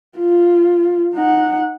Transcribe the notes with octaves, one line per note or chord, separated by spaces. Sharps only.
F4
D#4 F#5